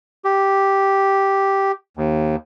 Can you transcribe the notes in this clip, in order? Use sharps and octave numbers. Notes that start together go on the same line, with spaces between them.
G4
D#2